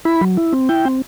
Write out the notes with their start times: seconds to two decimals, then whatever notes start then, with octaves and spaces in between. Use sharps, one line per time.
0.05 E4 B5
0.21 F#3
0.37 E4
0.52 C4
0.69 E4 G5
0.85 C4